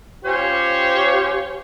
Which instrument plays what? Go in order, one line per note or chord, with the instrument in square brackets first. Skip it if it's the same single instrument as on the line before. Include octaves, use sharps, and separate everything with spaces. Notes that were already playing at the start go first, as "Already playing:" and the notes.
[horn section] C#4 F4 G4 C5 C#5